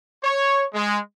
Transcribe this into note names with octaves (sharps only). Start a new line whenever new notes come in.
C#5
G#3